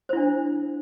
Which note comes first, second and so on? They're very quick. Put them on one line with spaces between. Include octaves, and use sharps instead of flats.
C5 E4 D4